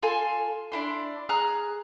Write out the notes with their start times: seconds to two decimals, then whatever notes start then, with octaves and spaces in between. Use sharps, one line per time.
0.03 F4 A4 G#5 C6
0.72 D4 E4 C6
1.29 G#4 A#5 F6 F#6